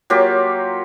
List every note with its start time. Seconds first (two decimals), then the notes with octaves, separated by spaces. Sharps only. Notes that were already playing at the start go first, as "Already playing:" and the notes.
0.10 F#3 A#3 F4 G4